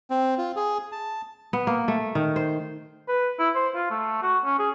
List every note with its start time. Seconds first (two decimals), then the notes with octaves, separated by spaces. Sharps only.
0.10 C4
0.38 F4
0.56 G#4
0.92 A5
1.53 B3
1.67 A#3
1.88 A3
2.15 D#3
2.36 C5
3.08 B4
3.39 E4
3.55 C5
3.75 F4
3.91 A3
4.22 F#4
4.45 C#4
4.59 G#4